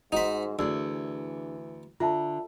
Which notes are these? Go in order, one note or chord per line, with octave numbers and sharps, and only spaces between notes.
G#2 D#4 F#4 C5 B5
D2 E3 D4 G#4 D5 E6
D3 F4 E5 A5